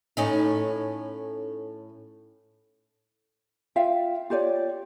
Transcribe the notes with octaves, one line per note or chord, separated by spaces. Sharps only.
A2 C#4 D#4
F4 E5 F5 G5
F4 G4 C#5 D5